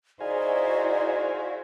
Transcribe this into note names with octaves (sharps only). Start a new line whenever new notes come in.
D#4 E4 F#4 G#4 C5 D5 F5 G#5